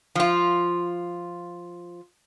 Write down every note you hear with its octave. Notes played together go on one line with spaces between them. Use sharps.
F3 F4